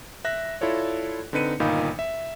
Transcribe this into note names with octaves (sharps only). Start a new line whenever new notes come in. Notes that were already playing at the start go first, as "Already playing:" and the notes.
E5 F#6 A#6
E4 F4 A4 C#5 D5
D3 C4 D#4 B4 C#7 D#7
G1 A#2 D#3 D#4 F5 B5
E5